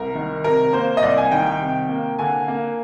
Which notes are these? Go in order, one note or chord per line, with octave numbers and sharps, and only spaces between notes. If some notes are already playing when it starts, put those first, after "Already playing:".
Already playing: C2 A#4
D#3
C3 A#4
A#3 C5
D#5
C2 D5
G#5
D#3 G5
G5
C3
A#3
D3 G#5
A#3